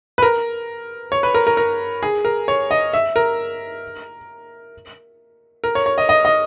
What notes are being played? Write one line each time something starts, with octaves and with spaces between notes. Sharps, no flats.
B4
A#4
C#5
B4
A#4
A#4
A#4
G#4
A#4
C#5
D#5
E5
A#4
A#4
C#5
C#5
D#5
D#5
D#5